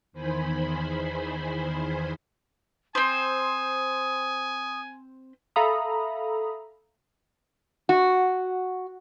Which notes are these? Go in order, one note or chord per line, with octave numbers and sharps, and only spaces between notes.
E2 D#3 C5 G#5 B5
C4 C5 G#5 D#6
A4 E5 F5 A#5 B5 D#6
F#4